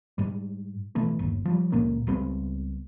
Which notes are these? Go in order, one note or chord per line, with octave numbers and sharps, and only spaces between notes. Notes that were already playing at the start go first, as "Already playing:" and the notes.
G#2 G3
B2 E3 A3 B3
G1 D#2
F3 G3
C#2 A#2 A#3 C#4
C#2 G3 B3 C4